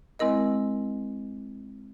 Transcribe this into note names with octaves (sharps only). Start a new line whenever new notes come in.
G#3 C4 E4 A#4 D#5